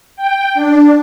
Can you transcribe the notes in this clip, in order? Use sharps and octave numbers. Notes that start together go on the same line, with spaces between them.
G5
D4